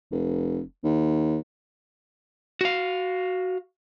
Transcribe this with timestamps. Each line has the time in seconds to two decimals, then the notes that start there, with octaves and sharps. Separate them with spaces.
0.11 F1
0.84 D#2
2.61 F#4 F5